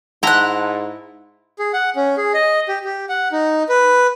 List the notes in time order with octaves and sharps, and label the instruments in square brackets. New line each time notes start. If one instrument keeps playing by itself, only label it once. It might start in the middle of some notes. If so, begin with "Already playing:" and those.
[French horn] G#2 [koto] E4 A#5 [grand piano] F#5 A5 [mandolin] C6 F#6
[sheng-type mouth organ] G#4
F#5
C#4
G#4
D#5
G4
G4
F#5
D#4
B4